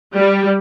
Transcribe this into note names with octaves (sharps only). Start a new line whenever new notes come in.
G3